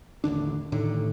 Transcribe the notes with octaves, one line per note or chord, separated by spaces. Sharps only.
A1 D#2 D3 D4
A1 A2 D3 D#3